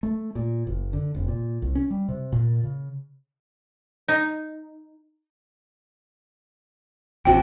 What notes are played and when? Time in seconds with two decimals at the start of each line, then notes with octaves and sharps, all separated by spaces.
0.03 A3
0.35 A#2
0.67 F#1
0.93 D3
1.15 F1
1.28 A#2
1.62 C2
1.75 C#4
1.91 G3
2.09 C3
2.32 A#2
2.63 C#3
4.08 D#4
7.25 A1 D#2 C3 F#4 G5